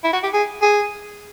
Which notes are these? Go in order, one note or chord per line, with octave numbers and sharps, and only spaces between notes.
E4
F#4
G4
G#4
G#4